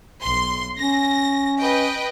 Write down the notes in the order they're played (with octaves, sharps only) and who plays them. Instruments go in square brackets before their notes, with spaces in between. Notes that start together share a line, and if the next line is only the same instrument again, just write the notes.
[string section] B1 C6
[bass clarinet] C#4 [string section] A#6
[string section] B4 D#5 G5